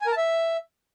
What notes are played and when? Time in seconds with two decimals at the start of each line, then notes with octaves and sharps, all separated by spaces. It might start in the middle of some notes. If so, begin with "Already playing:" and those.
0.02 G#5
0.07 A#4
0.12 A5
0.17 E5